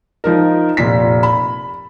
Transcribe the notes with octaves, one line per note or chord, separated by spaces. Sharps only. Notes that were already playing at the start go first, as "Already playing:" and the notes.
F3 D#4 A#4
F1 A#2 B6
B5